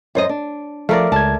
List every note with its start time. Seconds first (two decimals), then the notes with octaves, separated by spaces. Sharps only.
0.15 F#2 C5 D#5
0.29 D4
0.89 F3 A3 A#4 D5 F5 A5
1.12 C#2 A5 G#6